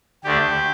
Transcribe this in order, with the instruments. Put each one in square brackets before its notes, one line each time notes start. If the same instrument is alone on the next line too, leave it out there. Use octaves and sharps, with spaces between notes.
[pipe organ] D2 D3 A3 D4 G4